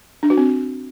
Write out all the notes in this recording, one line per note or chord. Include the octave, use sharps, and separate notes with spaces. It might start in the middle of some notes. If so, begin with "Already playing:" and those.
D4
F#4
C4